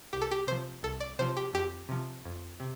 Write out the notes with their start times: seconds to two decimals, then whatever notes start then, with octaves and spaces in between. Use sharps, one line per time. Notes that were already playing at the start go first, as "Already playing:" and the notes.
0.13 C2 G4
0.21 A4
0.31 G4
0.47 C3 F3 C5
0.83 C2 A4
1.00 D5
1.19 C3 F3 C5
1.37 G4
1.54 F2 G4
1.89 C3 F3
2.25 F2
2.60 C3